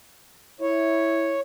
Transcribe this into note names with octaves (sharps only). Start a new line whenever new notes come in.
E4 C#5